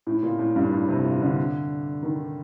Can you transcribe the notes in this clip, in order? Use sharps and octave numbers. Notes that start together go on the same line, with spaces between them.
A2
A#2
A2
G2
A2
C3
A#2
D3
D#3